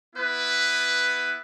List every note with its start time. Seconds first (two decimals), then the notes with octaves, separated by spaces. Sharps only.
0.16 B3 E4 B4